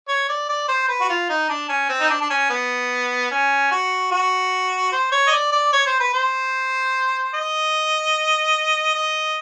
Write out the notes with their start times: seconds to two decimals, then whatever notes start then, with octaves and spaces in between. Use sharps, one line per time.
0.08 C#5
0.29 D5
0.49 D5
0.69 C5
0.89 B4
1.01 F#4
1.09 F4
1.29 D#4
1.49 D4
1.69 C#4
1.89 C4
2.01 D#4
2.10 D4
2.21 D4
2.30 C#4
2.50 B3
3.31 C#4
3.71 F#4
4.11 F#4
4.92 C5
5.12 C#5
5.27 D#5
5.32 D5
5.52 D5
5.73 C#5
5.86 C5
6.00 B4
6.14 C5
7.34 D#5
8.95 D#5